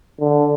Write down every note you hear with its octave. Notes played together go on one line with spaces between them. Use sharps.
D3